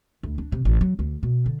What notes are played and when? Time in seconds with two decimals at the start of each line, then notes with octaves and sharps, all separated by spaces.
0.23 D2
0.38 D4
0.52 C3
0.65 A1
0.81 F#3
0.99 D2
1.23 B2
1.46 D3